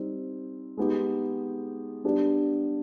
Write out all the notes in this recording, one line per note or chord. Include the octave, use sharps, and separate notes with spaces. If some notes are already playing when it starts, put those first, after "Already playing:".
Already playing: G3 C4 D#4
G#3 B3 D#4 G4
G3 B3 D4 G4